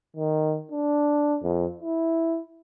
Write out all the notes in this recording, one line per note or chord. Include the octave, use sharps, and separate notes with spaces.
D#3
D4
F2
E4